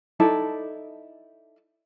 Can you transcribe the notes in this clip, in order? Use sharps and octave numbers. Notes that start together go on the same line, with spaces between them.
D#4 E4 A4 D5